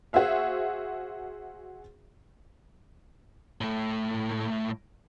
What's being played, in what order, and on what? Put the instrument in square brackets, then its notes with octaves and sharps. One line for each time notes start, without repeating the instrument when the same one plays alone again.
[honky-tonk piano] F#4 G#4 C5 E5 F5
[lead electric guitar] A2 A3